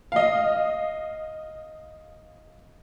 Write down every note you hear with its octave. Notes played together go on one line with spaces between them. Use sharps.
D#5 F5